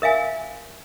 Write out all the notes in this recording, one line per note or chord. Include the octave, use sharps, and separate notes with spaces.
A#4 E5 F5 G#5